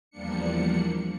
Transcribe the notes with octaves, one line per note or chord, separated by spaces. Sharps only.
E2 F3 G3 A#3 D4 C#7